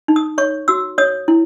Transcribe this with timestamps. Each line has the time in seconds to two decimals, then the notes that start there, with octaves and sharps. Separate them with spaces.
0.08 D#4
0.16 D#6
0.38 C#5 C#6
0.68 F#4 E6
0.98 C#5 D#6
1.28 E4